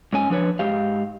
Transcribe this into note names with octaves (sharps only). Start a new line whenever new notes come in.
G#2 C#4 G#5
F3 D4 B4 C#5
G#2 G4 F5